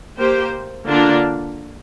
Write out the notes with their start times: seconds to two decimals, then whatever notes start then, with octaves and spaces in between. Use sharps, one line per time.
0.17 A#3 G4 C5
0.87 D3 A#3 D4 F4